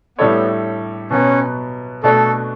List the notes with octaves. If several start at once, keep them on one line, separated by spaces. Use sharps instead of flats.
A2 G3 B3 D4 A4 C#5
B2 F#3 B3 C#4
B2 A3 D4 F#4 A4